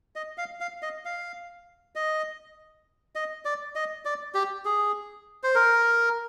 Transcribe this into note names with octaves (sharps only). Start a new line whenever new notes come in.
D#5
F5
F5
D#5
F5
D#5
D#5
D5
D#5
D5
G4
G#4
C5
A#4